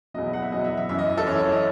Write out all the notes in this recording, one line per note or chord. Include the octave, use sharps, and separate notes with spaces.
E2 B2 F#3 D#5
E5
F#5
E5
E2 B2 F#3 D#5
E5
E5
F#2 E3 E5
D#5
D#5
A4
F#2 E3 C#5
C#5
D#5